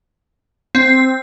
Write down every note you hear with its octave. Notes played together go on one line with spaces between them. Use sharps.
C4